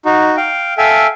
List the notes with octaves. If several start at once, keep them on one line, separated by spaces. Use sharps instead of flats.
D#4 F#4
F5 G5
A4 E5 F5 G5 G#5